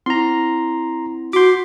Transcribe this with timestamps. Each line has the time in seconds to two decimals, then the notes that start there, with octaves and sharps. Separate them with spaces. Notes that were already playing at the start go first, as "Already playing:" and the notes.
0.06 C4 E4 A#5 C6
1.33 F#4 C6 D6 G6 B6